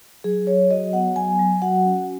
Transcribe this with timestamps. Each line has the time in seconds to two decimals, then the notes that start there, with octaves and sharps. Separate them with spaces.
0.24 F#3 G#4
0.47 F#3 C#5
0.70 F#4 D#5
0.93 B3 F#5
1.16 F#3 G#5
1.39 F#3
1.62 F#4 F#5
1.85 C#4